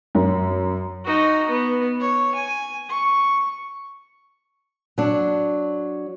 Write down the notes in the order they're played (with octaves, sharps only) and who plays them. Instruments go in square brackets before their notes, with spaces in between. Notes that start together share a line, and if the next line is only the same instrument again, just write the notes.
[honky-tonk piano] F#2
[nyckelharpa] D#4 F#4
B3
C#5
G#5
C#6
[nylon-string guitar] F#3 D4